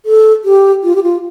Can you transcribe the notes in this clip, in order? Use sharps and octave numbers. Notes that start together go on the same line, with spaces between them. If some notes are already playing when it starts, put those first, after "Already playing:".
A4
G4
F4
G4
F4